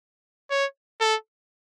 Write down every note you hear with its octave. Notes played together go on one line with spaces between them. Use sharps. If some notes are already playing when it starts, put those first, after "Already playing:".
C#5
A4